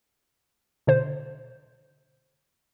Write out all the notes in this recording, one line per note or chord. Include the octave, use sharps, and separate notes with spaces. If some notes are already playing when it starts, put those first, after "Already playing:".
B2 D3 C5